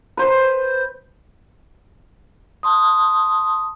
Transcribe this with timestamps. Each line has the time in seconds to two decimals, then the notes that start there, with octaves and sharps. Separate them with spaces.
0.17 B4 C5
2.63 A5 C6 D#6